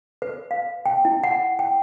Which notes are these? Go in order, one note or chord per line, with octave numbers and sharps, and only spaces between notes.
B4
F5
G5
E4
F#5
G5